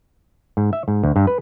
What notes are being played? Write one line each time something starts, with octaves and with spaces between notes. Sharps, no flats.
G#2
E5
G#2
D2
G2
B4